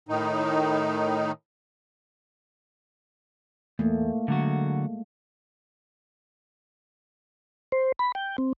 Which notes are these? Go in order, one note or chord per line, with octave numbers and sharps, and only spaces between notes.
A2 D#3 D#4
E2 A3 A#3
D3 F#3 G#3 F#4
C5
B5
G5
C4